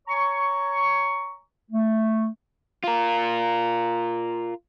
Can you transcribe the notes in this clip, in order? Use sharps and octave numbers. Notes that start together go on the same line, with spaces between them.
C#5 G#5 A#5 C#6
A3
F4 A#4